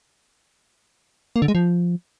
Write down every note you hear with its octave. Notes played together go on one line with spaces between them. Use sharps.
A#3
D3
G#3
F3